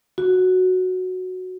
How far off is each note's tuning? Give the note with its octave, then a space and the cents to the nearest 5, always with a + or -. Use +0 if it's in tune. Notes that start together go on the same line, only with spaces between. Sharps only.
F#4 -5